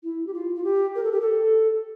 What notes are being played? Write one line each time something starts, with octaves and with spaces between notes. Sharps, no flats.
E4
G4
F4
F4
G4
A#4
A4
G4
A4